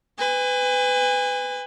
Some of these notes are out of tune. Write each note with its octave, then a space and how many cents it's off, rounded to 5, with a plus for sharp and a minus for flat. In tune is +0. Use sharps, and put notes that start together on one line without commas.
B4 +25 G#5 -35